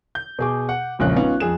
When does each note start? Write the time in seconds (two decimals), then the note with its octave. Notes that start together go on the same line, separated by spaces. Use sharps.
0.15 G6
0.39 B2 G#4 D6
0.69 F#5
0.99 E1 A#1 C#3 F#6
1.16 B3 C#4 D#4 F4
1.40 F2 G#4 E7